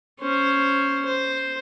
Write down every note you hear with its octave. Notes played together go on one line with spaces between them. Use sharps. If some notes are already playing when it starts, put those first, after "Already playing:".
C#4 C5
C5